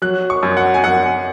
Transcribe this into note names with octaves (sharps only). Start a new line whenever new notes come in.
F#3 F#6
C#6
F#2
F#5
G#5
F#2 F#5